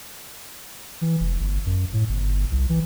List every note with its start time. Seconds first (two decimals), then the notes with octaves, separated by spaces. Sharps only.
1.01 E3
1.20 F1
1.40 G1
1.66 F#2
1.93 A2
2.09 G1
2.51 C2
2.69 E3